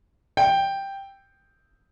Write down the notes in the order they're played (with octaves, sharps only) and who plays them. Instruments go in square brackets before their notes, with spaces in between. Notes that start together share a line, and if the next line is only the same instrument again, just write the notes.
[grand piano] G5